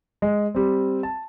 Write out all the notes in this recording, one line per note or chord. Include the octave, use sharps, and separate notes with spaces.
G#3
G3 C4
A5